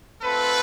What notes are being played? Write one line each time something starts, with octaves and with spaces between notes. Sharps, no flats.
A3 C4 F4 A4 B4